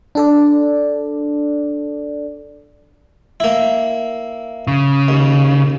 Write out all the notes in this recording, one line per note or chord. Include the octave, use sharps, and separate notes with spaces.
D4 A4 D5
A#3 E4
C#3
D#2